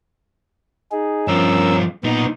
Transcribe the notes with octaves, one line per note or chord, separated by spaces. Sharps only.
D#4 G#4
G2 F3 C#4 A#4 E6
B1 A#2 B3 D#4